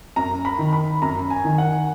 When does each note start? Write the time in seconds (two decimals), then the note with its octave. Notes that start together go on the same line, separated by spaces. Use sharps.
0.16 F#2 A#5
0.45 B5
0.58 D#3
0.73 B5
1.02 F#2 A#5
1.30 G#5
1.45 D#3
1.58 F#5